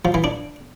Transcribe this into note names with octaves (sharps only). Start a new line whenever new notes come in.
F3
E3
D4